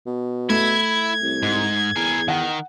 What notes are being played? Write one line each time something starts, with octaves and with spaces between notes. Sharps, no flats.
B2
A3 E4 G#6
C2
G#2
E2 G#4 A#4
D#3 F#5